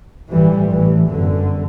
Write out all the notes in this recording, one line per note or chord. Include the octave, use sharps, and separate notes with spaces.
A1 G2 E3 G3
A1 A2 E3
G1 F#2 D3